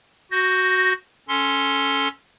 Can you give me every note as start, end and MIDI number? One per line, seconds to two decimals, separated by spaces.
0.31 0.93 66
0.31 0.93 91
0.31 0.93 94
1.28 2.08 61
1.28 2.08 69
1.28 2.08 84